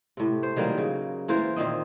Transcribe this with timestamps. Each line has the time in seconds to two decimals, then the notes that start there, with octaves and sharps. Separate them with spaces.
0.17 A2 C3
0.43 C5
0.56 D#3 F#3 G3 A#3
0.78 C#3
1.28 E3 A#3 F4 C5
1.56 A#2 D#3 C4 D#5